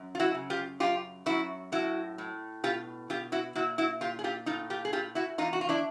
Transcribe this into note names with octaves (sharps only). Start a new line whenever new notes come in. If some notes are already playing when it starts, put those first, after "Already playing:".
Already playing: F#2
F4
E4 F#4
C#3
F4 G4
F#2 F4 G4
F#2 E4 F#4
A2 E4 F#4
A2
B2 F4 G4
B2 F4 G4
E4 F#4
A#2 E4 F#4
E4 F#4
A#2 F4 G4
G#4
F4 G4
A2 D#4 F4
F4 G4
G#4
A2 F4 G4
E4 F#4
E2 D#4 F4
F#4
F4
D4 E4